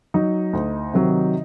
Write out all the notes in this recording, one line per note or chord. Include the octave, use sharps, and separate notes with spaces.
F#3 D#4
D2
C3 D#3 F#3